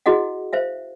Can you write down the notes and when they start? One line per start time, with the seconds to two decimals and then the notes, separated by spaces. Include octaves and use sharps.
0.06 E4 F#4 G#4 D#5 F#5
0.53 C5 E5 F5